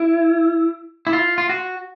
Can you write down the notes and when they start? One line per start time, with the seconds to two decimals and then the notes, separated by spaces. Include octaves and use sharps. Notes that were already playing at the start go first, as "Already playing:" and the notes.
Already playing: E4
1.07 E4
1.13 F4
1.38 F4
1.49 F#4